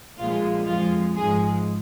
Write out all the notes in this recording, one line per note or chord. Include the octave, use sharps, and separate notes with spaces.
A#1 A#2 F3 G#3 F4
F2 F3 G#3 F4
G#1 G#2 F3 G#3 G#4